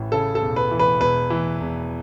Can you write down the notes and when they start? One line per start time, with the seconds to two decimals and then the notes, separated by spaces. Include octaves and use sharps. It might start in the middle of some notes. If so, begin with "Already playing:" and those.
Already playing: A1 E3
0.12 C#3 A4
0.35 A4
0.42 E1
0.56 B4
0.71 E3
0.79 B4
1.01 E1 B4
1.30 E3
1.61 E1